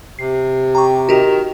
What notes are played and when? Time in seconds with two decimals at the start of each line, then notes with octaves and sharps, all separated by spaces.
0.19 C3 C7
0.75 G4 A#5 C#6
1.09 D#3 F#4 G4